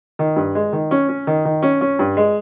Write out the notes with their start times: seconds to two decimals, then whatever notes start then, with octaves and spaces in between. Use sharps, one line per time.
0.19 D#3
0.36 G2
0.55 G#3
0.73 D#3
0.91 C#4
1.09 C#4
1.27 D#3
1.45 D#3
1.63 C#4
1.81 C#4
1.99 G2
2.17 G#3